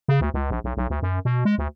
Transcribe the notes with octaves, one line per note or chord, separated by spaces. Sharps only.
C#3
D2
C#2
A#1
B1
B1
D2
F#2
B2
G#3
D2